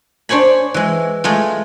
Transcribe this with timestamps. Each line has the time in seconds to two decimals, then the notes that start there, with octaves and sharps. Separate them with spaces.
0.29 D4 C5 C#5 G#5 B5
0.74 E3 G#3
1.24 G#3 A3 F4